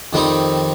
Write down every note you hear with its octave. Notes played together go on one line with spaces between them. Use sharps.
F2 D#3 G3 C4 D#4